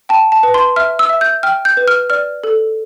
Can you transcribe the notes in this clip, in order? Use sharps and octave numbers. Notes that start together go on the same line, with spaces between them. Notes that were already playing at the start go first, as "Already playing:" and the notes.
G5 A5
A5
B4
C6
E5 F6
E6
E5
G6
G5 F6
G6
B4
F6
D5 F6
A4